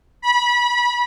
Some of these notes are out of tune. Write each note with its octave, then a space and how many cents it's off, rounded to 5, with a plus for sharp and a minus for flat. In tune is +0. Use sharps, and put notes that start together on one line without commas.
B5 -25